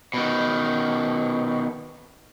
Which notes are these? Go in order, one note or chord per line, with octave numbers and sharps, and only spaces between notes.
B2 D#3